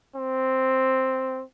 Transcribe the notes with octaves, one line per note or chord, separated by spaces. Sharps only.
C4